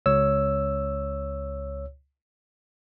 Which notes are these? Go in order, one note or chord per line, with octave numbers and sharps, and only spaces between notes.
C#2 C#5 E6